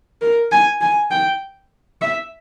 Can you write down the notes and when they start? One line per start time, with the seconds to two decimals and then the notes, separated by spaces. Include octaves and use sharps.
0.21 A#4
0.52 G#5
0.81 G#5
1.11 G5
2.01 E5